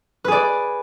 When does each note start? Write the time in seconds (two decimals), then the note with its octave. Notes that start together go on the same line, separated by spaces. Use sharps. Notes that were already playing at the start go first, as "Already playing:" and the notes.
0.24 B4
0.28 G#4
0.32 D5